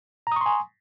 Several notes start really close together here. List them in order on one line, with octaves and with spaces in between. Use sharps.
A#5 D#6 C#6 C6 G#5